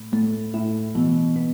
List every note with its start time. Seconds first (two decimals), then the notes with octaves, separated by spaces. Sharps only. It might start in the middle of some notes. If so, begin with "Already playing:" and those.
Already playing: A2
0.12 A2 A3
0.54 A2 E4
0.95 B2 E3
1.36 B3